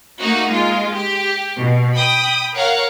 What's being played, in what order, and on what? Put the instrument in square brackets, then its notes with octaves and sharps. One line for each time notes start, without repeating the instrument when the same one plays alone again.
[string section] A3 A#3 D#4 F#4
G#3 F4
G4
B2
G5 B5 D#6
A#4 C#5 F5 F#5 A#5